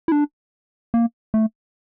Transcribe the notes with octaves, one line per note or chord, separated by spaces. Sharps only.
E4
D4
A#3
A3